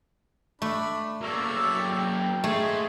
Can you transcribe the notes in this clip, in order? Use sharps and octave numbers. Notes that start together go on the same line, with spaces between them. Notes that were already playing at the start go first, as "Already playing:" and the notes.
A3 D4 B5
F#3 A#3 A4 D5 E5 C#6
G5
A3 D#4 G#4 C5